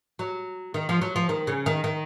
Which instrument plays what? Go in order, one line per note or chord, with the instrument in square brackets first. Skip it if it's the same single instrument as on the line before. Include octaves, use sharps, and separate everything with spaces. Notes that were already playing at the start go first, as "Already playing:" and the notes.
[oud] F#3
D#3
F3
F#3
F3
D#3
C#3
D#3
D#3